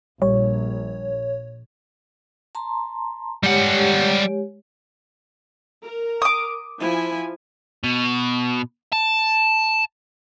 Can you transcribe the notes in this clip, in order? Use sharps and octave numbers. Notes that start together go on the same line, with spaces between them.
A#1 G3 C#5
A5 A#5 C6
G3 G#3 G4 C#5 F#5
A#4
D6 D#6
F3 E4 G#5
B2
A5